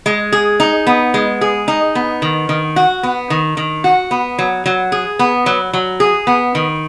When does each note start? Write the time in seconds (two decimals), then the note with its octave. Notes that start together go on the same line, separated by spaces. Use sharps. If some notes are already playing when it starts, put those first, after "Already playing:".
0.06 G#3
0.32 G#4
0.60 D#4
0.87 B3
1.14 G#3
1.41 G#4
1.68 D#4
1.95 B3
2.22 D#3
2.49 D#3
2.76 F#4
3.03 B3
3.30 D#3
3.57 D#3
3.84 F#4
4.11 B3
4.39 F#3
4.66 F#3
4.92 G#4
5.19 B3
5.46 F#3
5.73 F#3
6.00 G#4
6.27 B3
6.55 D#3